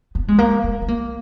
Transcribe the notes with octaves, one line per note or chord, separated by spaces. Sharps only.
B3
G#3
A#3
B3
B3
A#3